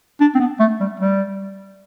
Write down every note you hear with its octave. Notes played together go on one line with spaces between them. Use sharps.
D4
C4
B3
A3
G3
G3